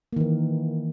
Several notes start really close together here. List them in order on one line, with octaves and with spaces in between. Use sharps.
A#3 D#3 E3